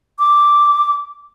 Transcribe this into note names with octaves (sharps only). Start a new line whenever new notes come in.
D6